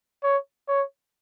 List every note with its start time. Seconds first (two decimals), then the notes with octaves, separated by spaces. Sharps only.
0.23 C#5
0.68 C#5